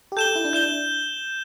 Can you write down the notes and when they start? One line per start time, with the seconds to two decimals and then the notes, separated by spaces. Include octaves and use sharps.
0.12 G4
0.17 A4 G6 E7 G7
0.26 G4
0.35 E4
0.45 D4
0.53 E4 G6 E7 G7
0.63 D4